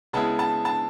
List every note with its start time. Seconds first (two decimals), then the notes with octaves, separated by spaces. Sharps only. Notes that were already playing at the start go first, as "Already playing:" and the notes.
0.13 C#3 G#3 B3 E4 A5
0.39 A5
0.65 A5